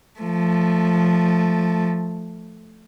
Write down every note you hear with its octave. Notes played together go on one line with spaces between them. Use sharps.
F3 A3